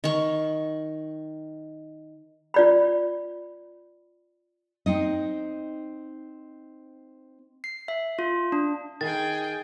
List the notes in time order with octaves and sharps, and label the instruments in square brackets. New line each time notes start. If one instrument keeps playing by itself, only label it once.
[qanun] D#3 C#6
[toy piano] F4 D5 B5
[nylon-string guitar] C4 D#4 D#5
[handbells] C7
E5
F4
D4
[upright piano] D#3 [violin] G#4 G5 [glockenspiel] A6